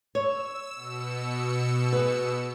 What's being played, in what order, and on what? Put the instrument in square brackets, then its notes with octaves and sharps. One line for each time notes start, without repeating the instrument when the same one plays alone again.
[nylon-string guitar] C#5 [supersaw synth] E6
[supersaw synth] B2 E6 C#7
[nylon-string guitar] G#4 B4